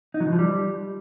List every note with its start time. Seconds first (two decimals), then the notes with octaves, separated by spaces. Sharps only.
0.14 D#4
0.20 F#3
0.26 E3
0.32 F3
0.39 G3